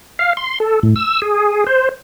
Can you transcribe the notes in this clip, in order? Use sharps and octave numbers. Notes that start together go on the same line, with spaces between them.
F5
C6
A4
A2
E6
G#4
C5